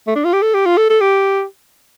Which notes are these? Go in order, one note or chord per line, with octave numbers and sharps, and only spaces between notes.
A3
D4
F4
G4
A4
G4
F4
A4
A4
G4